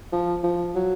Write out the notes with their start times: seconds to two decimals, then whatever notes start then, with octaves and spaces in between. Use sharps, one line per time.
0.13 F3
0.44 F3
0.75 F#3